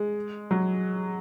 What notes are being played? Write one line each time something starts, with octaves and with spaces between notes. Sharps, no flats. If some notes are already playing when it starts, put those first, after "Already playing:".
Already playing: G#3
F#3